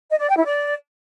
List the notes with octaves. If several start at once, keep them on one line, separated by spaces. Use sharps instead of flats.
D#5
D5
G5
E4
D5